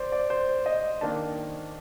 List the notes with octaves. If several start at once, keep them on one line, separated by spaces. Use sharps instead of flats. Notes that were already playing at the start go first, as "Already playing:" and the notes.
Already playing: C5 D5
D5
C5
D#5
D#3 A#3 D4 A5